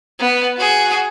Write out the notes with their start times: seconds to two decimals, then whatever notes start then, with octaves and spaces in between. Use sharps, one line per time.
0.20 B3
0.57 F#4 G#4